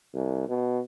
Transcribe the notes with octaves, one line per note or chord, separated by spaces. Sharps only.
C2
B2